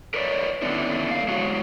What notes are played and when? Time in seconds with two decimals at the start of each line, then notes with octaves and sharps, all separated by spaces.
0.14 A#4 B4 C#5 D5
0.62 D3 D#3 B3 C#4 D4 E4
1.11 A3 F5
1.28 G#3 E4 F#4 C#5